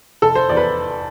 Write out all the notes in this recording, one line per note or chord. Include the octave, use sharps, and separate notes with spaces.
F1 A4
C5
E2 D5
B4